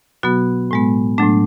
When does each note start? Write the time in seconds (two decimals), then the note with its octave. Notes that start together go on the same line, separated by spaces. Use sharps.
0.23 B2 F#3 B3 F#4
0.71 A2 G#3 B3
1.18 A2 F#3 A3 D4